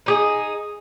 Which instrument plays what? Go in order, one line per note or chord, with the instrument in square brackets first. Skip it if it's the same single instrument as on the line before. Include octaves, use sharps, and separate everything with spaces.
[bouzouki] D#4 G4 G#4